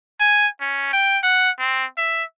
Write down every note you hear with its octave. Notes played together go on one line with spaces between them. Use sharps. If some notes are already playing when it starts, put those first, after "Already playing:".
G#5
C#4
G5
F#5
C4
E5